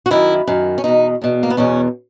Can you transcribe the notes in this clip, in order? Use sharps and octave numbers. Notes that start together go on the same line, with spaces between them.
F#4
F#2 D#3 E4
F#2 D#3
C#4
E2 B2 D#4
E2 B2
A#3
B3
E2 B2 C#4